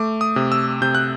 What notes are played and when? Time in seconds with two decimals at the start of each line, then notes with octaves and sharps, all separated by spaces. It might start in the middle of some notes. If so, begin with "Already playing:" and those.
Already playing: A3 D6
0.21 D#6
0.36 C3
0.52 E6
0.82 C3 G6
0.95 F#6